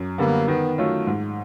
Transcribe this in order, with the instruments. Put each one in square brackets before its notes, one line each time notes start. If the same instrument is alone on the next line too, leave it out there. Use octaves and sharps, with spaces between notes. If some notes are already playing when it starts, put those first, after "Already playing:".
Already playing: [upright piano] F#2
[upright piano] D3 G3 B3 [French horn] A#3
[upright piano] D#3 [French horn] B3
[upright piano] F#3 A3 C#4 F4
G#2